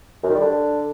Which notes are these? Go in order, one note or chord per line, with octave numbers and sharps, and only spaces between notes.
F#2
D#3
G3
D3